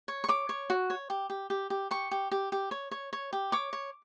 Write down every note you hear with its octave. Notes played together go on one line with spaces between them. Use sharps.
C#5
C#6
C#5 D6
C#5
F#4
C#5
G4
G4
G4
G4
G4 C#6
G4
G4
G4
C#5
C#5
C#5
G4
C#5 D6
C#5